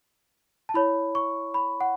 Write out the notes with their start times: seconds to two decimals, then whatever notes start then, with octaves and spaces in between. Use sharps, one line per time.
0.69 A5
0.74 E4 C#5 B5
1.15 C#6
1.54 B5
1.81 F#5